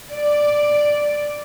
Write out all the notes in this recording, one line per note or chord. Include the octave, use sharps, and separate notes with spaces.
D5